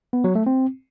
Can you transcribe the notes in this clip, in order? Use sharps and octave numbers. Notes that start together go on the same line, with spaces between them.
B3
F#3
A3
C4